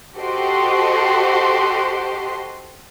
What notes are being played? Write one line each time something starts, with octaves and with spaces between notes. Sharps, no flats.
F#4 G4 A4 C5 D#5 C6